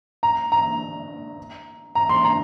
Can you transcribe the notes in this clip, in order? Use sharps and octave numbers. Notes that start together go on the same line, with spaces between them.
A#5
A#5
A#5
C6
A#5